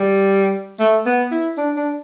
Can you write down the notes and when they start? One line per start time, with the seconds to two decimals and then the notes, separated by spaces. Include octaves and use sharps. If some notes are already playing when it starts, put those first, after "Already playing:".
Already playing: G3
0.80 A3
1.06 B3
1.31 E4
1.57 D4
1.76 D4